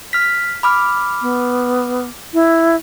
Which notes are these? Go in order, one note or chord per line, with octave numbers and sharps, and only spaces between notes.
F6 B6
B5 D6 F6
B3
E4